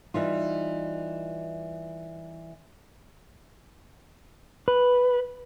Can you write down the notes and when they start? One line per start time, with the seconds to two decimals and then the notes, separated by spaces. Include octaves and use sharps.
0.14 E3 G3 D#4 F4
4.68 B4